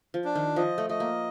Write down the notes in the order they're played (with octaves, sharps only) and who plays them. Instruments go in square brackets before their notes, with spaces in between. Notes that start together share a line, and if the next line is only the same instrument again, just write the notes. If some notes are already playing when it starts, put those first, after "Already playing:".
[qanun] F3
[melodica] D4
[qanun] D#3
[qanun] F3 [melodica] D#5
[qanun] A3
[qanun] A3 [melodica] D#5
[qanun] A#3